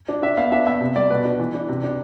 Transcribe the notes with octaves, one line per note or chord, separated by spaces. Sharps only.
D4
D4 E5
B3 F5
D4 E5
B3 E5
C3
G3 D5
B2 B4
D4
E3
D4
C3
D4